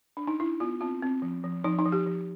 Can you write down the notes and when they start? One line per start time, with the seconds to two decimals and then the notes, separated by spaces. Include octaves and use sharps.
0.17 D4
0.27 D#4
0.39 D4 E4
0.60 B3 F4
0.81 C4 F4
1.02 C4
1.22 F3
1.44 F3
1.64 F3 D#4
1.79 D#4
1.85 F3
1.92 G4
2.06 F3